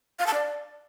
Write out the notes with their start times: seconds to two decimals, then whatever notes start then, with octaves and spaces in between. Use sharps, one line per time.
0.19 F5
0.27 A5
0.34 D5